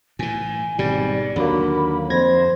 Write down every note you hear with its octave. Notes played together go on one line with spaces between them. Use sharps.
A2 E3 G#5
G#1 G#2 B2 G3 D5
D#2 D3 F#3 A#3 B5
F2 C5 G#6 A#6